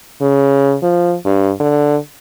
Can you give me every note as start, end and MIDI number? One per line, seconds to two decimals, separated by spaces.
0.21 0.76 49
0.83 1.15 53
1.25 1.52 43
1.60 1.96 50